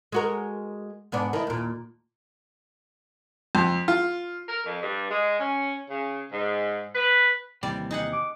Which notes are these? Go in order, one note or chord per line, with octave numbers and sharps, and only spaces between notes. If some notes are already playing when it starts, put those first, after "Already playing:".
G#3 F#4 A#4
G#2 B3 D4
D#3 E4
D#2 A#2
F2
F4
A#4
F2
G2
G#3
C#4
C#3
G#2
B4
D#2 C3 E3 G3 D5
D#4 G#4 F#5
D6